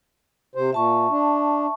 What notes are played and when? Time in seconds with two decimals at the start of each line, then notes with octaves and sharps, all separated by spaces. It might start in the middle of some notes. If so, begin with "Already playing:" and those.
0.55 C3 C5
0.73 A#2 E5 A5 C#6
1.11 D4